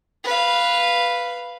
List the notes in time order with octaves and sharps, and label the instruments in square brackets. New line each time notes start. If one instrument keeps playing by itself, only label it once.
[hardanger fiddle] B4 F5